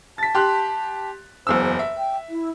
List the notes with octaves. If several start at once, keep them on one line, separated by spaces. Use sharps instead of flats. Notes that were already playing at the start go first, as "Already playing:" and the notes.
A5 A6 B6
G4 C6 F#6
F#1 E2 C5 E6
E5
G5
E4